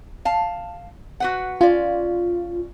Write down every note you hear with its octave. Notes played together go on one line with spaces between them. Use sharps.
F5 A5
F#4 B4 F#5
C#4 F4 D5